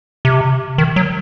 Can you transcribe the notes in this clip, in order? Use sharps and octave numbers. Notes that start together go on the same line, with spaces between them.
C3
D#3
F#3